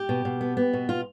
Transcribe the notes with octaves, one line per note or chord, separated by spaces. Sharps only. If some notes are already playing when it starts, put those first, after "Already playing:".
Already playing: G4
B2
B2
B3
B3
B2
B2 F4